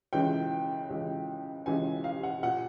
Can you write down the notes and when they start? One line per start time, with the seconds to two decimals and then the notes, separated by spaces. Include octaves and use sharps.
0.13 C#2 C#3 E3 G5
0.90 C#2 C#3 E3
1.66 C#2 C#3 E3 G#5
2.04 F5
2.23 F#5
2.43 A#2 F#5